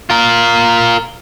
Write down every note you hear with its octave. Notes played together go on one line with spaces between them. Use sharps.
F4 A#4